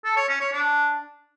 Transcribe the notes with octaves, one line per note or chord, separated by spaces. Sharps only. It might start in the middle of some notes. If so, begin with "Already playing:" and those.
A4
C#5
C#4
C#5
D4